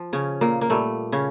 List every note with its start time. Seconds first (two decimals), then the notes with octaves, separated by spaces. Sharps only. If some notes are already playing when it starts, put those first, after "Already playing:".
Already playing: F3
0.13 C#3 C#4
0.41 A#2 A#3
0.61 A#3
0.70 A#2 G3 A3
1.12 C#3 C#4